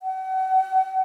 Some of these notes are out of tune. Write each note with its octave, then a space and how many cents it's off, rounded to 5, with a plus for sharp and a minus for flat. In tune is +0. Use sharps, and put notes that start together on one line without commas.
F#5 +35